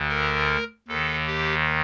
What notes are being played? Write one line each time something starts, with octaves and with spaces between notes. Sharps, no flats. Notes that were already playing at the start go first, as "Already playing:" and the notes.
Already playing: D2 D3
A#4
D#2 D#3 A4
G4